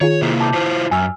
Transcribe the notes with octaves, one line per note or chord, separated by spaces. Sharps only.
D#3 F4 G#4 C#5
C3 A#3 E4
A5 D6 G6
E4 F4 C5
F#2 G#5 E6 F6